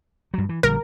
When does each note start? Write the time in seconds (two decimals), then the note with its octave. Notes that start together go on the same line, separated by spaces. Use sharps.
0.34 G2 F#3
0.49 E3
0.63 A#1 D3 G3 A#4